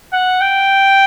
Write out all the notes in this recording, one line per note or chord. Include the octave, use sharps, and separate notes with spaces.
F#5
G5